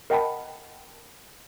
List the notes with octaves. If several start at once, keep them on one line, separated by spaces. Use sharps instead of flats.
A#4 D#5 F#5 G5 A5 B5